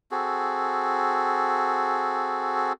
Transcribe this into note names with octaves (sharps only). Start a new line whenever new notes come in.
C4 F#4 G#4 A4